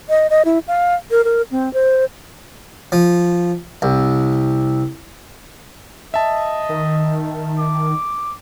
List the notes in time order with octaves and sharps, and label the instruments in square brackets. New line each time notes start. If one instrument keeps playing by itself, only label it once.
[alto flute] D#5
D#5
E4
F5
A#4
A#4
C4
C5
[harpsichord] F3
C2
[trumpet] D#5 [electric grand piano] E5 A5
[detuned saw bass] D#3
[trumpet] D6